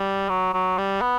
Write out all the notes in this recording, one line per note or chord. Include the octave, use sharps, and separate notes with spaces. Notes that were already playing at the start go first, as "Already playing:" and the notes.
Already playing: G3
F#3
F#3
G3
B3